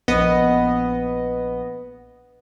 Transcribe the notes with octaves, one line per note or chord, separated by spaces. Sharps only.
A#1 B3 D#5